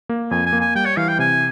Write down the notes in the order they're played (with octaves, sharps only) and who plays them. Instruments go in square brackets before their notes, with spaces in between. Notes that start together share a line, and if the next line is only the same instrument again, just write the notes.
[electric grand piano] A#3
[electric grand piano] F2 [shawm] G#5
[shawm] G#5
[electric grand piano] A#3
[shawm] G#5
[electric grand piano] G3 [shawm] G5
[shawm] C#5
[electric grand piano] E3 [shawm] F5
[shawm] G5
[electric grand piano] C3 [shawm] G#5